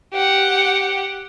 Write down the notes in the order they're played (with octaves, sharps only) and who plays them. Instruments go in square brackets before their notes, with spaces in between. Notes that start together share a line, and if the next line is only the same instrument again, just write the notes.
[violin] G4 F#5